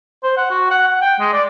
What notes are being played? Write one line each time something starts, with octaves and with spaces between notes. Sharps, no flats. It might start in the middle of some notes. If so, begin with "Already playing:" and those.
C5
F#5
F#4
F#5
F#5
G5
G#3
D5